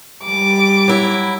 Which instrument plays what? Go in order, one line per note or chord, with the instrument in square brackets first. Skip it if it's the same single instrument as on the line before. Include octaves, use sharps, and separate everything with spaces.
[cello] G3 [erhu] D6
[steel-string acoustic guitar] F#3 E4